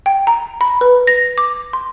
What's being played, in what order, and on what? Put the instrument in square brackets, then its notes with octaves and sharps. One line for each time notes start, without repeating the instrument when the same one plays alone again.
[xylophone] G5
A#5
B5
B4
A#6
D6
C6